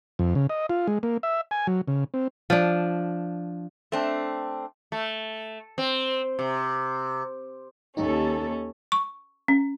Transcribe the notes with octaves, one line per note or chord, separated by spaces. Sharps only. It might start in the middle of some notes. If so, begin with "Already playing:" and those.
F2
C#3
D#5
F4
G#3
A#3
E5
G#5
F#3
C#3
C4
F3 D4
A3 C4 D4
A3
C4
C3
D#2 C#4 D#4 G4 A4
C#6
C#4